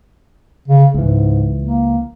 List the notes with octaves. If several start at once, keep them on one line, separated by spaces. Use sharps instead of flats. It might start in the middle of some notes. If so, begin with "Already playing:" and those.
C#3
C#2 G#2 E3
A#3